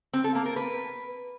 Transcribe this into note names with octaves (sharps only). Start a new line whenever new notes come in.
C4
A4
A#3
A#4
B4